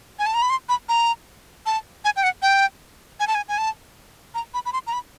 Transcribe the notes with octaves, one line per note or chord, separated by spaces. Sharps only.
G#5
A5
A#5
B5
C6
B5
A#5
A5
G#5
G5
F#5
G5
G#5
A5
G#5
G#5
A5
A#5
B5
B5
C6
A#5
B5